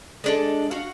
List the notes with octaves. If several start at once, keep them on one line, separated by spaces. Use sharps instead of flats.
G#3 D4 A4
F#4 F5